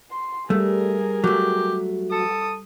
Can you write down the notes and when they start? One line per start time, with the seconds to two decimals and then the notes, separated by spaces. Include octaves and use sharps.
0.11 C6
0.50 G3 A3 G#4 A#4
1.24 F#3 A3 G4
2.12 A4 D#6